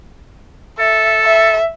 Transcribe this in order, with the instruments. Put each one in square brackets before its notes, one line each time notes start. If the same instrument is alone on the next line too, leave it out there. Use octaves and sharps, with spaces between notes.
[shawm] A4 [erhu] E5
[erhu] E5